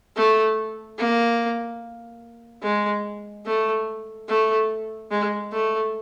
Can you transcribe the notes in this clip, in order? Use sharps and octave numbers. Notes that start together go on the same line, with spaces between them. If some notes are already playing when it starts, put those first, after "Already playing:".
A3
A#3
G#3
A3
A3
G#3
A3